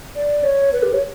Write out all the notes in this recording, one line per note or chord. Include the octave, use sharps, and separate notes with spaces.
D5
C#5
B4
G4
C#5